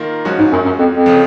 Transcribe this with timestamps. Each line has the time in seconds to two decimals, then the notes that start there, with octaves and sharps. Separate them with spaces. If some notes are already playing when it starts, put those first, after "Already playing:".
Already playing: D#3 A#3 F4 A#4
0.25 F3 G#3 C#4 F#4
0.39 G#2
0.52 F#2
0.65 F#2
0.79 F2
0.92 F2
1.06 C#3 F3